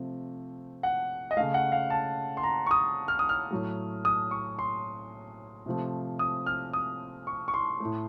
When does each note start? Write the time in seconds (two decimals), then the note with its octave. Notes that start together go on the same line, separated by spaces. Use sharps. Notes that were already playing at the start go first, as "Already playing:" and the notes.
Already playing: C3 F3 A3
0.83 F#5
1.31 D#5
1.37 C#3 A3 F5
1.54 F#5
1.72 F5
1.90 A5
2.37 C6
2.43 A#5
2.66 C#6
2.71 D#6
3.08 F6
3.19 D#6
3.29 F6
3.51 A2 F#3 A3
4.05 D#6
4.31 C#6
4.59 C6
5.66 C3 F3 A3
6.19 D#6
6.46 F6
6.73 D#6
7.27 C#6
7.48 C#6
7.54 C6
7.80 A2 A3